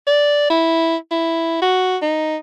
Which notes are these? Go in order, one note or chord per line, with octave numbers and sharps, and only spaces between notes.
D5
E4
E4
F#4
D#4